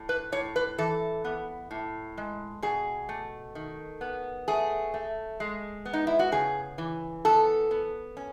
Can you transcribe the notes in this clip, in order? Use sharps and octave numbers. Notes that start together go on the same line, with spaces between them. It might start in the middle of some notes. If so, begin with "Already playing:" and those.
Already playing: A2
B4
A2 C#5
B4
E3 A4
B3
A2
G#3
B2 G#4
A3
D#3
B3
A3 G#4
A3
G#3
B3
D#4
E4
F#4
C#3 G#4
E3
B3 A4
B3
C#4